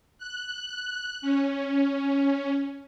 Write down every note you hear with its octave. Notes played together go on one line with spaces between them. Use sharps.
F#6
C#4